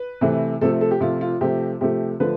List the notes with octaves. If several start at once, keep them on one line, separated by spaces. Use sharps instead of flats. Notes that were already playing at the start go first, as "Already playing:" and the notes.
Already playing: B4
C3 E3 A3
C3 F3 A3 A4
A4
G4
C3 F3 A3 F4
F4
C3 F3 A3 G4
C3 F3 A3 G4
D3 F3 A3 B4